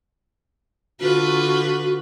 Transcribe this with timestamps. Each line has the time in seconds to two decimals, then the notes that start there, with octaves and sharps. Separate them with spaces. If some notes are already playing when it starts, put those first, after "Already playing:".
1.00 D3 F4 F#4 B4